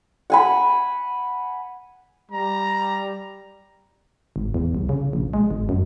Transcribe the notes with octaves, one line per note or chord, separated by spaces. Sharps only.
F#5 G#5 B5
G3 A#5
G#1
E2
C2
C#3
A#1
G#3
G#1
F#2